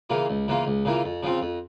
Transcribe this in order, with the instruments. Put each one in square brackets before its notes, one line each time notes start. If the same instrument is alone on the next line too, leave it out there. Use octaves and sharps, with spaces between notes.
[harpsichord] C#3 E3 A#3 F4
C#2
C#3 E3 A#3 F4
C#2
C#3 E3 A#3 F4
F2
C#3 F3 C4 F4
F2